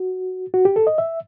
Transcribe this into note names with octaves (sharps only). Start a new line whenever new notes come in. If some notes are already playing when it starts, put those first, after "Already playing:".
Already playing: F#4
F#4
G4
A4
D#5
E5